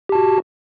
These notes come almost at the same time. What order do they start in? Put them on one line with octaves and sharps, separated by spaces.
G4 A5 F#4